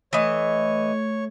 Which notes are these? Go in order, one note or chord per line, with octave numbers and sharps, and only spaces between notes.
E3 A3 C#5 D#5